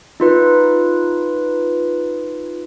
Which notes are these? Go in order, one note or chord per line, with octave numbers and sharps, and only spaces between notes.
D#4 F4 B4